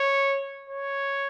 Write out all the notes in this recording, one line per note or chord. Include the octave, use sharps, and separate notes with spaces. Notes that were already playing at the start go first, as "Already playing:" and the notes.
Already playing: C#5
C#5